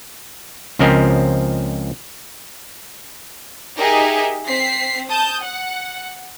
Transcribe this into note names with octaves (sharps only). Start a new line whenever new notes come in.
C#2 F3 C4 C#4 A#4 D#5
D#4 G4 G#4 A#4 D#5 E5
C4 B6 C7
A5 D#6 G6
F#5